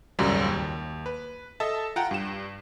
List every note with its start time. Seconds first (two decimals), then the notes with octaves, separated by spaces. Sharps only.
0.19 G#1 C#2 F#2 A#2 F#3 G3
0.49 D#2
1.06 B4
1.60 A4 D#5 E5 A5
1.96 F4 F#5 G5 A#5
2.11 G2 E7